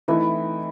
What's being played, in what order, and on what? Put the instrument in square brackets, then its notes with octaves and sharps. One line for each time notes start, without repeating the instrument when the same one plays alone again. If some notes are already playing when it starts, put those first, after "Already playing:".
[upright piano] E3 A3 C4 D#4 [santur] E4